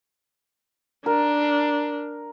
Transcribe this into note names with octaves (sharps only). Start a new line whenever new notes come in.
D4 A#4